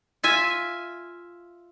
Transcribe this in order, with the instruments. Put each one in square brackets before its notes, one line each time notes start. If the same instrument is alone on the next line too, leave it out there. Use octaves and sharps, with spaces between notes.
[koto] F4 E5 G#5